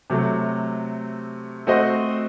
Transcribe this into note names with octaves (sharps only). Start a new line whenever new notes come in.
C3 F#3 A3
A3 C4 F#4 C5 D#5